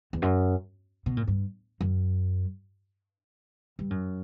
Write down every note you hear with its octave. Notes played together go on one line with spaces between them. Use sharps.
E2
F#2
B2
A#2
G2
F#2
G2
F#2